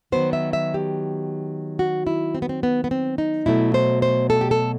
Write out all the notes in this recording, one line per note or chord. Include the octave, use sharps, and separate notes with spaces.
D#3 F#3 B3 C5
E5
E5
G4
F#4
E4
C4
B3
C4
B3
B3
C4
D#4
B2 F#3 A3 E4
C5
C5
A4
G4
A4